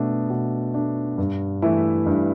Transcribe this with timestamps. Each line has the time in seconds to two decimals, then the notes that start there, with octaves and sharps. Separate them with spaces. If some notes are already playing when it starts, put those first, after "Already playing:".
Already playing: B2 A3 D4
0.30 B2
0.74 A3 D4
1.18 G2
1.62 E3 A3 E4
2.06 G2